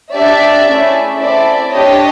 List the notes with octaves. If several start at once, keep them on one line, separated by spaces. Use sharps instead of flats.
D4 G4 D5 E5
A3 C#4 E4 G#4
C4 E4 A4 D5 E5
D4 G4 C#5 D#5